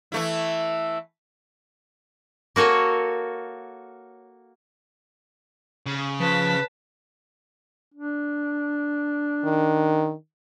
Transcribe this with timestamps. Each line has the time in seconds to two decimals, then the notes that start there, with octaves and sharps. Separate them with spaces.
0.12 E3 A3 E4
2.56 A#3 F#4 A4 C#5 G#5
5.86 C#3
6.20 F3 B4 A5 B6
7.94 D4
9.44 D#3